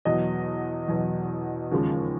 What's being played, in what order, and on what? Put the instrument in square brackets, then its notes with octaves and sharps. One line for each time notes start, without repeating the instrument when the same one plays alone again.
[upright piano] E2 B2 F#3 D#5
E2 B2 F#3
D#2 C#3 F3 G#3